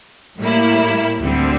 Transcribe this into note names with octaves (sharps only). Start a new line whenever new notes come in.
A2 G3 A#3 E4
D2 D3 G3 C4